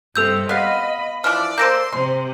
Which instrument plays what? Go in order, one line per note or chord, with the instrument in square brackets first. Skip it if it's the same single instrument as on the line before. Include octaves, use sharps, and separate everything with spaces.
[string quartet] G2 C3 [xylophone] A4 E6 G6
[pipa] B3 F5 [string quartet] D#5 B5
[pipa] E3 F3 D4 [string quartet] D5 [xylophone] F6
[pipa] A#3 A4 C5 [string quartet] C6 [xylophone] G6 A#6 D7
[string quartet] C3 C4 [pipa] C6